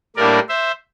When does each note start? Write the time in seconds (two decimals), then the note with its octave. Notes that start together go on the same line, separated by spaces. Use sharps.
0.16 A2 G3 A#3 D4 A#4 D5
0.49 C5 E5